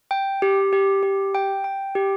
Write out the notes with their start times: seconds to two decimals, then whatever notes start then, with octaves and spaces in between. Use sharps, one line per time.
0.11 G5
0.42 G4
0.73 G4
1.03 G4
1.35 G5
1.64 G5
1.95 G4